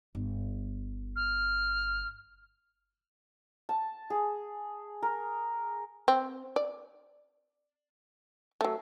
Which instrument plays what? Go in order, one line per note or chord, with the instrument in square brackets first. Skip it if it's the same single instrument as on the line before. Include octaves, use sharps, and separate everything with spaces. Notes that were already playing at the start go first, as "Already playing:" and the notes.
[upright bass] G1
[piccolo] F6
[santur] A5
G#4
A#4
[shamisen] C4
D5
F#3 A3